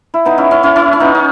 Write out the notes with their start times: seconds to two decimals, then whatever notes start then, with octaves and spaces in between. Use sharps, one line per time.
0.14 E4
0.25 B3 D#4
0.38 C#4 E4
0.51 C#4 E4
0.63 C#4 E4
0.76 C#4 E4
0.93 C#4
1.00 B3 D#4
1.15 D#4